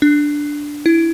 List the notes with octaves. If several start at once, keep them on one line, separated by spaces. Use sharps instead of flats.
D4
E4